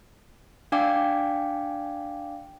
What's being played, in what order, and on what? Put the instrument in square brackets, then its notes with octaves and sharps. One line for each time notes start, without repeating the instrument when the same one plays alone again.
[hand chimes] D4 D5 F5 G5 G#5 D6